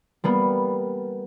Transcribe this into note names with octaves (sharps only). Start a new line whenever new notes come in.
G3 A#3 B3